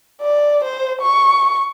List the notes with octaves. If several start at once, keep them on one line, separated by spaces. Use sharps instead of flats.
D5
C5
C#6